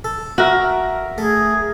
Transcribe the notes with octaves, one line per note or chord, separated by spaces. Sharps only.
A4
F#4 A#4 E5
A3 G#4